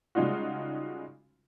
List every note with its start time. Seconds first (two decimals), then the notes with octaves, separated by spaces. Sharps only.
0.15 C#3 G3 G#3 D#4 F4 F#4